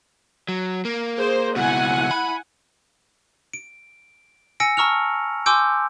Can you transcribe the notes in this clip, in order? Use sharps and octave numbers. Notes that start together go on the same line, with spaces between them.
F#3
A#3
G#4 C5
C#2 B2 E4 F#5 G#5
B5
D7
G#5 E6 A#6 C#7 D7
A5 A#5 C#6 E6 F6 F7
G#5 C6 D6 E6 G6 D7